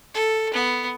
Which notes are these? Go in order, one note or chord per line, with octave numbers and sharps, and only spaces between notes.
A4
B3